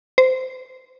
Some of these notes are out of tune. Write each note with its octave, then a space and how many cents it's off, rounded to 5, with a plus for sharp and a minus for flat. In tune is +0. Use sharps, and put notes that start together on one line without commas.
C5 -20